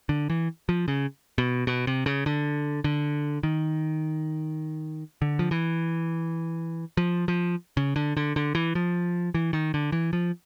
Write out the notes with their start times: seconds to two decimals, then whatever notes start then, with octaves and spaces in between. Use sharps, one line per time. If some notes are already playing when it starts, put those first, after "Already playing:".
0.09 D3
0.30 E3
0.69 F3
0.88 C#3
1.38 B2
1.67 B2
1.87 C3
2.06 C#3
2.26 D3
2.84 D3
3.43 D#3
5.22 D3
5.39 F3
5.51 E3
6.97 F3
7.28 F3
7.77 C#3
7.96 D3
8.17 D3
8.36 D3
8.55 E3
8.75 F3
9.34 E3
9.53 D#3
9.74 D3
9.92 E3
10.13 F3